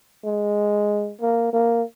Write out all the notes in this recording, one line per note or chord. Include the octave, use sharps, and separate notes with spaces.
G#3
A#3
A#3